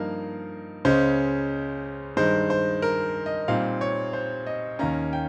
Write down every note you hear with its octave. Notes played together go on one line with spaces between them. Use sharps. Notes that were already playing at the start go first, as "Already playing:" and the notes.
Already playing: G2 F3 A#3 D#4 A#4
C#2 C#3 G#3 C#4 C5
G2 D#3 G#3 C5
C5
A#4
D#5
A#2 G3 C4 D#4 F5
C#5
C5
D#5
D#2 D#3 A#3 C#4 A#5
G5